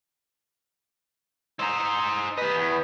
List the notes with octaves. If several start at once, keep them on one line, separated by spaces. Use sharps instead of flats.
D#4 C5 A#5 E6
G4 B4 D#5 D#6 B6
E2